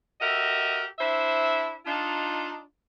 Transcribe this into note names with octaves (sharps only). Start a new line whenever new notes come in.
F#4 G4 A4 A#4 D#5 E5
D4 E4 C5 E5
D4 D#4 F4